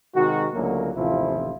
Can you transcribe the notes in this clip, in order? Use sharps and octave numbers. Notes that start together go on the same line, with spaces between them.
C3 D#3 G#3 F#4
C#2 D3 F#3 A3 A#3
A1 D#2 C3 F3 E4 F4